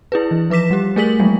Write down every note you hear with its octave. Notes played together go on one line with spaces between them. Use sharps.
E4 G#4 B4
E3
F3 B4 D6 B6 E7
G3 G4
A3 G#4 A#4 G#5 B6 F#7
F3 F#3 G#3 A#3